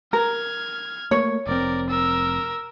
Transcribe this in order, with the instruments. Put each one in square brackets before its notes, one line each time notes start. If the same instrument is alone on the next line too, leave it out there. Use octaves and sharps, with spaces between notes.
[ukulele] A#4 [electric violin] F6 G#6
[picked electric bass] A3 A#3 [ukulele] C#5
[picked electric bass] F1 C4 [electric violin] A#4 D5
[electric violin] A#4 E6